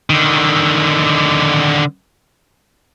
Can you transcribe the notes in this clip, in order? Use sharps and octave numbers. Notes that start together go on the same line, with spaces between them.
D3 D#3